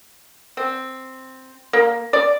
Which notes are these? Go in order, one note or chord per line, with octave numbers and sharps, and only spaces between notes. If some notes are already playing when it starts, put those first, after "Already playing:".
C4
A#3
D5